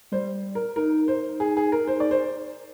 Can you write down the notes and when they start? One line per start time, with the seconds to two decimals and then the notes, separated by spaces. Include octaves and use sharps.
0.12 G3 C5
0.55 A#4
0.76 D#4 A#4
1.08 C5
1.40 G#4
1.57 G#4
1.72 A#4
1.88 C5
2.00 D5
2.11 C5